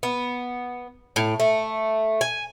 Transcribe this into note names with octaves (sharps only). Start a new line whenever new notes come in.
B3
A2
A3
G#5